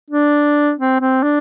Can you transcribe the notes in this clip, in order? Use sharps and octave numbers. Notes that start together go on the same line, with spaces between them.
D4
C4
C4
D4